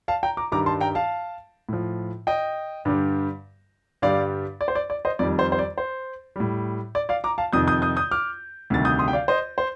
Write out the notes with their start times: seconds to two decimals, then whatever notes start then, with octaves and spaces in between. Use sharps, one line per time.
0.08 F5 A5
0.23 G5 A#5
0.37 A#5 D6
0.52 G2 D#3 G3 A#5 D6
0.66 A5 C6
0.81 G5 A#5
0.95 F5 A5
1.69 A2 F3
2.27 D#5 G5
2.85 G2 D3 G3
4.02 G2 D3 G3 D5 F5
4.61 D5
4.68 C5
4.75 D5
4.90 D5
5.05 C5 D#5
5.19 F2 D#3 G3 D5
5.39 C5
5.52 C5
5.59 D5
5.78 C5
6.36 A2 G3
6.95 D5
7.09 D5 F5
7.24 A#5 D6
7.38 F5 A5
7.53 F2 C3 D#3 D#6 G6
7.68 D#6 G6
7.82 D#6 G6
7.97 D#6 G6
8.11 D6 F6
8.70 D2 C3 D#3 G3 A6
8.85 D#6 G6
8.99 C6 D#6
9.08 G5
9.13 D5 F5
9.28 C5 D#5
9.58 C5